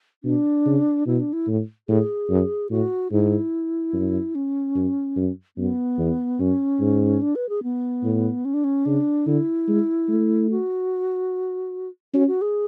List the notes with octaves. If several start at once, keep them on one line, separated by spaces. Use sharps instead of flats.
B2 D4
C#3
B2 E4
D4
E4
A2
A2 G#4
F#2
A2 F#4
G#2 E4
F#2
C#4
F#2
F#2
F#2 B3
E2
F#2 C#4
G#2
D4
B4
G#4
B3
A2
C#4
D4
C#4
C#3 D4
D3 E4
G#3
A3
F#4
C#4 F#4
F#4
G#4